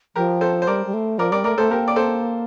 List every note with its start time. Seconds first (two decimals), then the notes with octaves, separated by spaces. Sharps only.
0.16 F3 G4 A#4
0.41 A4 C5
0.62 C5
0.67 G3 A#4 D5
0.86 G3
0.94 A3
1.18 F3 A#4 D5
1.31 G3 A#4 D5
1.44 A3 A#4 D5
1.58 A3 A4 C5
1.71 A#3 G4 A#4
1.88 D5
1.96 A4 C5